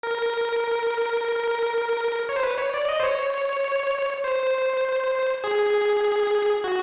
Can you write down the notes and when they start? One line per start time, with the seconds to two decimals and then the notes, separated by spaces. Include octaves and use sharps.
0.03 A#4
2.29 C#5
2.36 C5
2.43 B4
2.58 C#5
2.74 D5
2.89 D#5
3.00 C5
3.04 C#5
4.24 C5
5.44 G#4
6.64 F#4